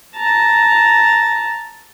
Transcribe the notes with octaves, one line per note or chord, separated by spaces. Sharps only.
A5 A#5